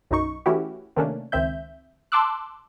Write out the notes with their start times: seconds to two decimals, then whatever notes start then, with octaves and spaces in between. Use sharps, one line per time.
0.11 B1 F#2 D#4 C#6
0.46 E3 A3 C#4 E4 F#4 G4
0.96 C3 D#3 A3 A#3 C#4 D4
1.32 C#2 D#3 C4 E5 G6
2.12 A5 C6 D6 E6 F#6